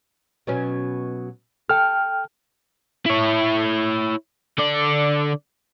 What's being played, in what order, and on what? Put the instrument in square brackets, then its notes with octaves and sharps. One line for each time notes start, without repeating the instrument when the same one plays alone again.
[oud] B2 F#3 C#4
[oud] A4 [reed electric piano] G5 F6
[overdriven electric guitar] E4 C#5
D3 D5